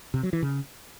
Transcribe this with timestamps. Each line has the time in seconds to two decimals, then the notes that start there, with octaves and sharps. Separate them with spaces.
0.14 C3
0.23 F#3
0.33 E3
0.42 C#3